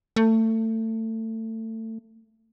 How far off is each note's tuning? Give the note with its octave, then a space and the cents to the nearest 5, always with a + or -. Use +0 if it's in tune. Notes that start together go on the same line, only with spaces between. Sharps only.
A3 +25